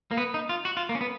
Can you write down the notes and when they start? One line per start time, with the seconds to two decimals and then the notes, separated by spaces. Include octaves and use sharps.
0.11 A#3
0.17 B3
0.34 D#4
0.49 F4
0.65 F#4
0.77 F4
0.89 A#3
0.95 C#4
1.01 B3